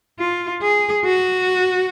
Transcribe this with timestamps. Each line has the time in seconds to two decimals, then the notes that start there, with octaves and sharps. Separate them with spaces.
0.19 F4
0.62 G#4
1.05 F#4